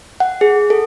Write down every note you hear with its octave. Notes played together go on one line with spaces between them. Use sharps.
F#5
G#4
A4